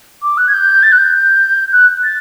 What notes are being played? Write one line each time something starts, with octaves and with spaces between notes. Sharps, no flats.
D6
F#6
G#6
G6
A6
F#6
G6
F#6
A6